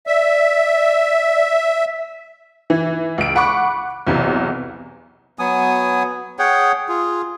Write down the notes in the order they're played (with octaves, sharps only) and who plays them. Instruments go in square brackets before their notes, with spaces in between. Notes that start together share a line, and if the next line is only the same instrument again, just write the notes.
[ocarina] D5 [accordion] E5
[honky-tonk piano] E3
C#2 D7
F#5 B5 C#6 D6 F#6
B1 E2 C3
[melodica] F#3 B3 G#5 D#6
G#4 C#5 F#5 G5
F4 G#4